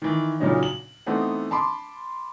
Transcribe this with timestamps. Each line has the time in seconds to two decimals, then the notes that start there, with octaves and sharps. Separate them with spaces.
0.02 D#3 E3
0.40 A#2 C#3 F#3 C#4 D#4
0.63 F#7
1.06 E3 A3 B3 C4 D#4
1.51 A5 B5 C6 D6